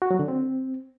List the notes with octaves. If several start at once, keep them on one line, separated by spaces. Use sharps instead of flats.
F#4
F#3
D3
C4